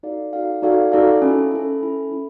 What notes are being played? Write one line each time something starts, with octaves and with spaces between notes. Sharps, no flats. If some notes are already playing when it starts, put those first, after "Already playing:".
D#4 F#4 A4 D5 F5
D#4 F#4 A4 D5 F5
D#4 F#4 A4 D5 F5
D#4 F#4 A4 D5 F5
C#4 E4 A4
C#4 E4 A4
C#4 E4 A4
C#4 E4 A4